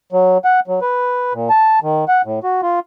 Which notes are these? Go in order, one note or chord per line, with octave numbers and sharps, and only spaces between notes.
F#3
F#5
F#3
B4
A#2
A5
D#3
F#5
A2
F#4
F4